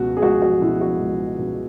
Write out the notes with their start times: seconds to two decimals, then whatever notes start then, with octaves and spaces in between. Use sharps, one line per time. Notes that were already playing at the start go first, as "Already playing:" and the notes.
Already playing: C#2 B2 F#4
0.17 G#4
0.22 C#2 F#4
0.42 F#4
0.62 B2 E4
0.81 F#4
1.00 C#2
1.39 B2